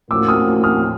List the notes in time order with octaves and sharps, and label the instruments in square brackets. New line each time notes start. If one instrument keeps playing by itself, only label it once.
[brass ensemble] A2 F3 A#3 C#4 F#4 [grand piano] D6 E6
[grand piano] D#6 F6
D#6 F6